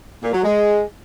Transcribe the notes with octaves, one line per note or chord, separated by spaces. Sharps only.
A#2
F#3
G#3